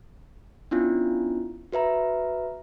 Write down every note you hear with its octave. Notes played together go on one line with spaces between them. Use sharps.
B3 C#4 D4 E4 F4
F#4 B4 E5 A#5